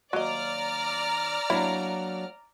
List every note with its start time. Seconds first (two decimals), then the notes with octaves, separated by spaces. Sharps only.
0.13 D#2 F#3 D5 D#5 A#5 F6
1.50 F#3 A#3 D4 E4